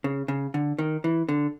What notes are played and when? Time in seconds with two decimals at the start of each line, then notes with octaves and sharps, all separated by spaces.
0.04 C#3
0.28 C#3
0.54 D3
0.79 D#3
1.04 E3
1.29 D3